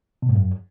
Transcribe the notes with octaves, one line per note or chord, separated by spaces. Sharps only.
B2
G#2
F#2